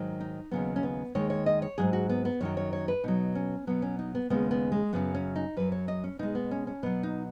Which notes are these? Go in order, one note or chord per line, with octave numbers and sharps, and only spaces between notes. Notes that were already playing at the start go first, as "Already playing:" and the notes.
Already playing: G#2 D#3 F#3
D#4
D#2 C#3 F#3 B3
C#4
B3
D#2 D#3 G#3 C#5
C#5
D#5
C#5
G#2 D#3 F#3 G#4
F#4
B3
B3
F#2 D#3 F#3 C#5
C#5
C#5
B4
B2 F#3 D#4
C#4
B2 F#3 B3
C#4
D#4
B3
D#2 C#3 G#3 B3
B3
G#3
F#2 C#3 F#3 B3
C#4
D#4
F#2 F#3 B4
C#5
D#5
C#4
B2 G#3 D#4
B3
C#4
C#4
B2 F#3 B3
D#4